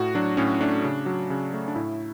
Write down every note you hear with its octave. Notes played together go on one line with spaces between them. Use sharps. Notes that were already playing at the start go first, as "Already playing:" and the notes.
Already playing: A2 F#4
F#3 D4
A2 C#4
A3 D4
C#3
F#3
C#3
A3
D4
A2 E4